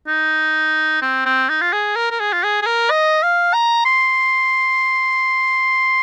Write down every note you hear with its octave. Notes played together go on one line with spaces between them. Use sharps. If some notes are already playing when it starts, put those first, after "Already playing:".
D#4
C4
C4
D#4
F4
G#4
A#4
A#4
G#4
F4
G#4
G#4
A#4
D#5
F5
A#5
C6